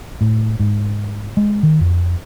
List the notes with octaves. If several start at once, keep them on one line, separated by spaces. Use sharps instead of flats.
A2
G#2
G#3
D#3
F2